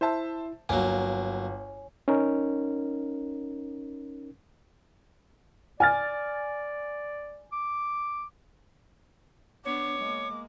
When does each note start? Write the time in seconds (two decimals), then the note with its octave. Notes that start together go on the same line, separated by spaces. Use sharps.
0.01 E4 C5 E5 A5
0.69 G1 F#3 A#3 C#5 G#5
2.08 C#4 D#4 A#4
5.80 D5 G#5 F6 A6
7.52 D6
9.65 B3 D4 C#5 D6
9.98 G#3 A#3